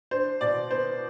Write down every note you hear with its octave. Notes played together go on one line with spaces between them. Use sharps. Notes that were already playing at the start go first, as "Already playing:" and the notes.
D4 C5
B2 D5
B3 C5